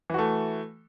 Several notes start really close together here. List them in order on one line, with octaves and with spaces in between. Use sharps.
E3 F#4 A3